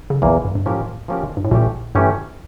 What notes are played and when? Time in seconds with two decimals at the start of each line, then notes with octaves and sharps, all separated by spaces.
0.10 C#3
0.22 A#1 E2 A#2 E3 A#3
0.45 G2
0.55 G2
0.66 A2 F3 A#3 C#4 G4 A#4
1.08 F3 A#3 C#4 G4 A#4
1.37 G2
1.44 A2
1.51 A#1 A#2 E3 A3 C#4 G4
1.95 G2 E3 A3 C#4 G4